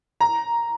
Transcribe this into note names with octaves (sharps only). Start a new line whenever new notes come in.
A#5